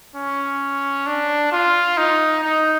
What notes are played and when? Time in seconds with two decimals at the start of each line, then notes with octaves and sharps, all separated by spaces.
0.16 C#4
1.07 D4
1.52 F4
1.98 D#4
2.43 D#4